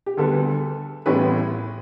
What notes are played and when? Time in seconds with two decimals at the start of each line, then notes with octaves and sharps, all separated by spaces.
0.06 G4
0.17 D2 D3 G3 B3 A4
1.06 A1 A2 G3 B3 B4